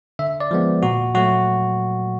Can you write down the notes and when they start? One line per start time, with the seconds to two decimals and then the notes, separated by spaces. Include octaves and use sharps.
0.19 D3 E5
0.40 D5
0.51 F3 G#3 B3
0.83 A#2 F#4
1.14 F#3 A3 F#4